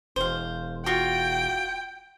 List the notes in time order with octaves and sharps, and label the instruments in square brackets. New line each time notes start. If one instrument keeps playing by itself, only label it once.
[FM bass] E1 [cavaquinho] C5 F5
[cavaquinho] F4 F#4 [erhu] G5